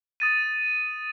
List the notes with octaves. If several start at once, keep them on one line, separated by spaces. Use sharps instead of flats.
D#6 A6 D#7